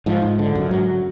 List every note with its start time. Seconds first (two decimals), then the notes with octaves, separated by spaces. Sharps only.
0.06 G#2 F3
0.22 G#2
0.39 D3
0.55 F#2
0.71 G#2 F#3